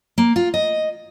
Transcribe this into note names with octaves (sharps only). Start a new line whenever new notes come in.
A#3
F4
D#5